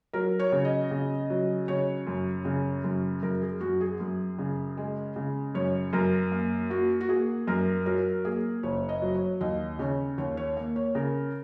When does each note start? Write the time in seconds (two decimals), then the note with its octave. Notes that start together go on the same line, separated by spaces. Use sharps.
0.13 F#3 A#4
0.39 C#5
0.52 C#3
0.65 D#5
0.91 C#3
1.30 F#3
1.68 C#3 C#5
2.07 F#2
2.45 C#3
2.84 F#2
3.22 F#2 A#4
3.41 G#4
3.61 F#2 F#4
3.81 G#4
4.00 F#2
4.39 C#3
4.77 G#3
5.16 C#3
5.54 F#2 C#5
5.93 F#2 A#4
6.32 A#3
6.70 A#3 F#4
7.01 F#4
7.09 A#3 G#4
7.47 F#2 A#4
7.86 F#3 A#4
8.25 A#3 G#4
8.63 F#1 C#5
8.89 D#5
9.02 F#3
9.14 C#5
9.41 D#2 D#5
9.79 C#3 C#5
10.18 D#2 C#5
10.37 C#5
10.57 A#3
10.76 C#5
10.95 C#3 A#4